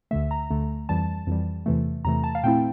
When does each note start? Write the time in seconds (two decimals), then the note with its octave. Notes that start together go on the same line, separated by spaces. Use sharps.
0.11 D2 D3 A3 E5
0.31 A#5
0.51 D2 D3 A3
0.89 F2 E3 G3 A5
1.27 F2 E3 G3
1.66 E2 C3 E3 A3
2.05 E2 C3 E3 A3 A#5
2.24 A5
2.35 F5
2.43 A#2 A3 C4 E4 G5